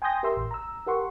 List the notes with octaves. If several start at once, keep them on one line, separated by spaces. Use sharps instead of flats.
G5 G#5 C6 D#6 G6 A#6
G4 A#4 E5 C6 E6
A1
A#5 E6
G4 A#4 F#5 C6 C#6